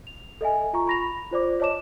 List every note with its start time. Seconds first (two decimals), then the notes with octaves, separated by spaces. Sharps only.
0.07 F7
0.41 A4 D#5 E5 G#5
0.73 F4 A#5 C#6
0.87 B5 A#6 F7
1.31 F4 C5 D5 D6
1.60 C#5 D#5 A5 D6 E7